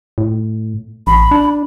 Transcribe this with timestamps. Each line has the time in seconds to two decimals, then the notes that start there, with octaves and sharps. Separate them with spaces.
0.18 A2
1.07 A1 B5
1.31 D4